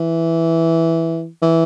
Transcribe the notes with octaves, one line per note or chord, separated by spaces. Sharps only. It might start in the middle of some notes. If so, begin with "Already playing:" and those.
Already playing: E3
E3